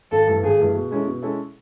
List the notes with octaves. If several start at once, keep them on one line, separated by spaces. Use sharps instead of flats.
G#1 A4
G2 E3 A3
G#1 G#4
G2 E3 A3
B2
G#3 C#4 E4 A4
B2
G#3 C#4 E4 A4